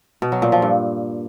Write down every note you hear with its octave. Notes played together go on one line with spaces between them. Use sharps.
B2
F#3
A#2
F3
G2